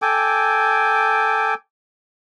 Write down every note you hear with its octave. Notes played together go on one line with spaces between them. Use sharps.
A4 G5 G#5 D6